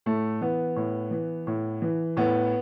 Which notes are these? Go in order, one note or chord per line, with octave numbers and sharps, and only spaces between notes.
A2 A3
E3 B3
A2
E3
A2
E3
A2 B3